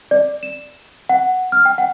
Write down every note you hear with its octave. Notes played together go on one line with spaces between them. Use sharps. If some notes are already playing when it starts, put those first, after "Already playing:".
D5
E7
F#5
F6
G5
F#5